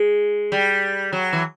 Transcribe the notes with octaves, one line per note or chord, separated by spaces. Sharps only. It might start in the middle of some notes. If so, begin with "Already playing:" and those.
Already playing: G#3
G3
F#3
E3